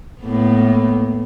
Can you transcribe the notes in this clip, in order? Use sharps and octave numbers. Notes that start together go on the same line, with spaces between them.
A2 A#3 B3